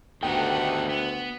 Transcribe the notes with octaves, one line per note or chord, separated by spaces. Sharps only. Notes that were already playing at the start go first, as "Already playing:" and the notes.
D2 D#3 A3 B3 D#4 G4 F#5 G5
B3